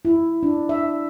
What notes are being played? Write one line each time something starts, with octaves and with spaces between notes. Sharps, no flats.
E4
D4
E5